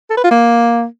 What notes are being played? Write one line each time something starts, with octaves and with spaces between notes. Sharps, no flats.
A4
B4
F4
A#3